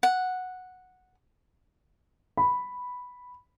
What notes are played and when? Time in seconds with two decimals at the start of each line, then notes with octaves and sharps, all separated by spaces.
0.03 F#5
2.37 B5